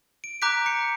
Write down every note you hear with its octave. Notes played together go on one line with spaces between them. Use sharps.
D7
A#5 D6 F#6 G6 B6 D7
C#7